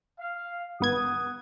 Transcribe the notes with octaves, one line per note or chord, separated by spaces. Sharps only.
F5
G#1 B3 F#5 D#6 G#6